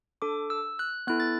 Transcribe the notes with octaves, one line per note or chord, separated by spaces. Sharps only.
D4 A4 D6
E6
F#6
B3 E4 A4 F#6
A6